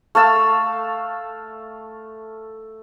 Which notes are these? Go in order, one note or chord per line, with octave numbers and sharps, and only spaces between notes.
A3 F5 A5 E6